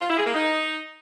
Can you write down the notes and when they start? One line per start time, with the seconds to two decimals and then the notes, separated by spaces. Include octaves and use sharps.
0.01 F4
0.09 E4
0.18 G#4
0.26 A#3
0.34 D#4